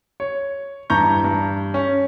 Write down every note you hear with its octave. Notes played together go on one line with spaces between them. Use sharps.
C#5
G2 E3 A#5 C#6 G6
G2
C#4